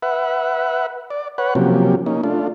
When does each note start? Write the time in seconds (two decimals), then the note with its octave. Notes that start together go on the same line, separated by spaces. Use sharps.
0.02 B4 E5 F#5
1.10 D5
1.38 B4 C#5 F#5
1.55 C3 F3 F#3 A#3 C#4 G4
2.06 A#3 C#4 D#4
2.24 A3 D4 F4